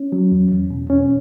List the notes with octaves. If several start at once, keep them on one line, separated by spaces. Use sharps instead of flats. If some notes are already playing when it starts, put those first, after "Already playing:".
Already playing: C#4
F#3
E2
E2
B2
E2 C#4